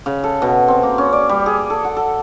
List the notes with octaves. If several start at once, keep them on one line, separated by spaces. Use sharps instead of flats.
C#3
A4
B2
C4
A#3
C#4
D5
G3
G#4
A4
F#5
A4